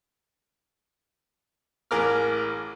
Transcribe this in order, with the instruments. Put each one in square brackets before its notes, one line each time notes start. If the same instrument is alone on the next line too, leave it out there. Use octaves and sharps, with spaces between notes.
[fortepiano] A1 G#4 A#4 D6 F6